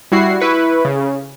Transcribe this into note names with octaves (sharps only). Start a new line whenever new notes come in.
G3 E4 F#4 C7
E4 B4 C#6
C#3